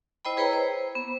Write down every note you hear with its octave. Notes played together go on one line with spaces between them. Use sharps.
E4 C5 D#5 G5 B5
E4 G#4 B4 C#5 G5 A#5
C5
B3